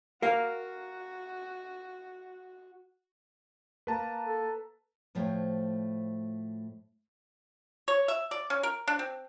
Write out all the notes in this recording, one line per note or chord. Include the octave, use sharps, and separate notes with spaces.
F#4 A#4 F5
A#3 B4 A5 A#5
A4
A2 F3 A3 C5 C#5 G5
C#5
E5
D5
C#4
A#4
D4
C4